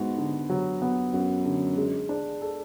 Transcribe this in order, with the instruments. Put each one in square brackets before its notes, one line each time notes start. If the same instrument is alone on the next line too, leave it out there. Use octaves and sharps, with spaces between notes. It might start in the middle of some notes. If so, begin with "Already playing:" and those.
Already playing: [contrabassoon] G#2 [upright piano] B3 F#4
[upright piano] D3
F#3
B3
[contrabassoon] F#2 [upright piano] F#4
[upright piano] D3
G#3
D4
A4